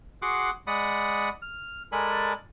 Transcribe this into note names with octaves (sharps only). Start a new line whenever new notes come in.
F#4 G#4 F#5 C6 D6 F#6
G#3 D5 F#5 B5 D#6
F6
G#3 A4 A#4 D5 G#5 B5